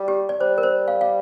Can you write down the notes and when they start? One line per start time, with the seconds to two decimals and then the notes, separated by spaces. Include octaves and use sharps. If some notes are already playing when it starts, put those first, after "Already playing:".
Already playing: G3
0.08 G4
0.29 D5
0.40 G3 C5
0.58 A#4
0.63 C5
0.88 F5
1.01 F5